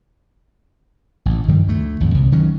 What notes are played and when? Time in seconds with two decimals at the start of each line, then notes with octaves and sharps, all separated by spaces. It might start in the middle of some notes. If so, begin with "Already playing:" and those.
1.26 A1
1.48 G2 D#3 F3 G3
1.67 D2 A3
2.00 G#1 F2 A#2
2.14 C2
2.32 D#3 F#3 C#4